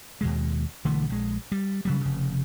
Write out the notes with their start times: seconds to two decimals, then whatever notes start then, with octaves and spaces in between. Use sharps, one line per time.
0.21 D#2 B2 G#3
0.85 B1 D3 E3 A3
1.10 A#1 G#3
1.52 G3
1.85 C#3 F#3 G3
2.01 F1 C#3